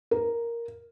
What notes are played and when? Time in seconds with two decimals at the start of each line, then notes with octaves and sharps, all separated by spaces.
0.11 A#4